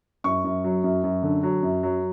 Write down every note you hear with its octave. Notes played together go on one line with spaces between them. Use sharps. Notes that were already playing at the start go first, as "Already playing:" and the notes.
F#2 C#6
F#2
F#3
F#2
F#2
D3
F#3
F#2
F#3